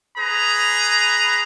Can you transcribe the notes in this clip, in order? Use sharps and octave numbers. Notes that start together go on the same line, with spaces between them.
G#4 B4 A#5